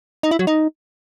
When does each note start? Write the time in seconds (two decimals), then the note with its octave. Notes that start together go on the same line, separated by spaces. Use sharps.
0.23 D#4
0.31 E4
0.39 F#3
0.47 D#4